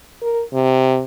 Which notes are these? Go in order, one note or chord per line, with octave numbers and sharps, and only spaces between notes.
A#4
C3